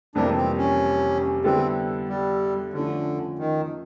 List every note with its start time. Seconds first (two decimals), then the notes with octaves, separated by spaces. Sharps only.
0.15 F2 C3 E3 G3 A#3 D4
0.37 C4
0.58 C#4
1.44 D3 G3 B3 C4 E4 A4
2.08 G3
2.73 D3 F3 A3 C#4
3.39 D#3